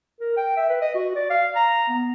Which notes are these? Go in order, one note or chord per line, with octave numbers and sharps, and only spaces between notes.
A#4
G5
E5
B4
D#5
F#4
D5
F5
A#5
B3